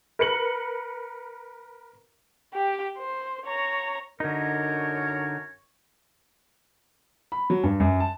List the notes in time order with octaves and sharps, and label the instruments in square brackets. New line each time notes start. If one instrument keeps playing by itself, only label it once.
[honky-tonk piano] A#4 B4 C#7 F#7
[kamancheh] G4 G5
C5
C#5 A#5
[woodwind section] F#2 A#4 C#5 [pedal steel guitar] D3 D#4
[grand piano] B5
F#3
G2
F#2
A5